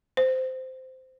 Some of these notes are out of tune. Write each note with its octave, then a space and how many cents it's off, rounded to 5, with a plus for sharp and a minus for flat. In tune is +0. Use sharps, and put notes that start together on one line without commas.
C5 -15